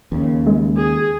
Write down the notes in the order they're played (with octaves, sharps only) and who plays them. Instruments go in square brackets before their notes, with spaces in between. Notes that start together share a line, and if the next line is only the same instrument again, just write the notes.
[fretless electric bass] D#2 C#3
[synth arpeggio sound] G#3
[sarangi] G#4